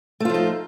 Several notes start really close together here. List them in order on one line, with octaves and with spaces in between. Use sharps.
A3 F4 F3 D#4